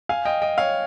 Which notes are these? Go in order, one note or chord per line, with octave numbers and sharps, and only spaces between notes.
F5 G#5
D#5 G5
D#5 G5
C#5 F5